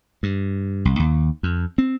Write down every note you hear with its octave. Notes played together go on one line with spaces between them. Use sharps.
G2
C2
D#2
F2
C4